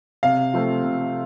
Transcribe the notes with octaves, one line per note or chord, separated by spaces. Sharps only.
C3 F5
F3 A3 C4
C3